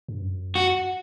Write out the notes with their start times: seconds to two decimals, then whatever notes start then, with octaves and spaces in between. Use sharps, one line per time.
0.08 G2
0.21 F#2
0.55 F#4